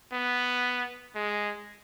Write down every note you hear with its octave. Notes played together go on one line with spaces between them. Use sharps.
B3
G#3